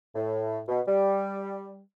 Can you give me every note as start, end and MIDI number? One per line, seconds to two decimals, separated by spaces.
0.15 0.60 45
0.68 0.81 47
0.88 1.80 55